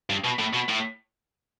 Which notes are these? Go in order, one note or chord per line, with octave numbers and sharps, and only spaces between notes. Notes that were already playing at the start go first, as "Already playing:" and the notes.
G2
B2
A2
B2
A2